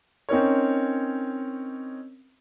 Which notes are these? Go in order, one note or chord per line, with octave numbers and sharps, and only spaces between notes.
C4 C#4 D#4 A#4 C#5